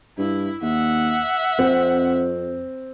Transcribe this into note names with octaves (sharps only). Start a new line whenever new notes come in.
G2 E4
D#2 E5 F#5
F2 C4